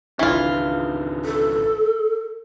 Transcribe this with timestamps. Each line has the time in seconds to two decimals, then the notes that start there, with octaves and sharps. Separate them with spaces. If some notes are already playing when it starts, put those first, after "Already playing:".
0.19 G#1 C#2 E3 D4 F4
1.25 A4